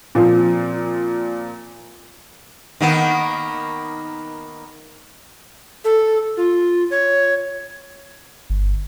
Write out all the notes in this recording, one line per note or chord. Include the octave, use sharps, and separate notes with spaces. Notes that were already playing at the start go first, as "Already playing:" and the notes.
A#2 F3 C4
D#3 A#3 B3
A4
F4
C#5
G1